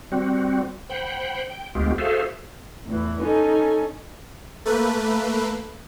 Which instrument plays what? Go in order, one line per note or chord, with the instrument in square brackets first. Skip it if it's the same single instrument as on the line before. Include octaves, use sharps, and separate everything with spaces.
[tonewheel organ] G3 C4 F#4
C5 F#5 G5 B5
G5
D2 G#3 B3 F4 G4
F#4 G#4 A4 C5 E5 F5
[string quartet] E2 A2 E3
C#4 D#4 A4 G#5
[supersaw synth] A3 A#3 B4